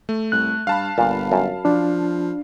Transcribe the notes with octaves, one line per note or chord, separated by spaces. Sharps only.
A3
C2 F#6
G2 F5 A5 B5
G1 A#2
F#2
F3 D4